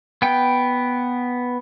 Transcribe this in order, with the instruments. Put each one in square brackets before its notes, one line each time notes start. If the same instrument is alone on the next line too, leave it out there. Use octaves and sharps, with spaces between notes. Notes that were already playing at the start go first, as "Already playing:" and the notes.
[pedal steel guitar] B3 G5